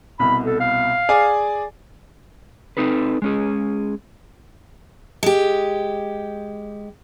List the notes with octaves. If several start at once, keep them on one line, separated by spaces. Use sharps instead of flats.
C2 B2 B5
A4
F5
G#4 D5 G#5
C4 D#4 A4 B4
G#3 C#4 G#4
G#3 G4